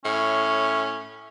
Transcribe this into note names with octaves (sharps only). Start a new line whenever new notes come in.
A2 C#4